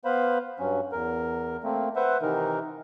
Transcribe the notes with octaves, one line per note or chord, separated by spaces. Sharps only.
B3 B4 C5 F5 B5
G2 F#3 C#4
E2 A#4
A3 A#3 C4
B4 C5 E5 F#5
C3 D#3 E3 D#4 A#4